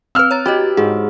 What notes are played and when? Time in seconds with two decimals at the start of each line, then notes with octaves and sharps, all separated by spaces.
0.15 C4 B4 E6 F6
0.31 C#5 A#5 A6
0.46 F#4 G4 C#5 D#5
0.77 G#2 F#4 G#4